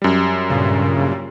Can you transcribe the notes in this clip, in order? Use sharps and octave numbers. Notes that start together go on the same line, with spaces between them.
F#2 G3
G2 A#2 C#3